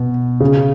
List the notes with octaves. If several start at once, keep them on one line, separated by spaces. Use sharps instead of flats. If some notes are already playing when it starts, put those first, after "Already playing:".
Already playing: B2
C#3